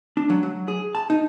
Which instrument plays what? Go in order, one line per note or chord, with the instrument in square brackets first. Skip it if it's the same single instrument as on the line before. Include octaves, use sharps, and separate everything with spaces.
[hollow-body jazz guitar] D4
F#3
F#3
G#4
A5
D#4